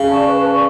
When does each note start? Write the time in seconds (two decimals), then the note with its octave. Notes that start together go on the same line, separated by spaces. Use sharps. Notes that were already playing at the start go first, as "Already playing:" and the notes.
Already playing: C#3
0.09 D5 A5 C#6
0.27 B4
0.44 D5 A5 C#6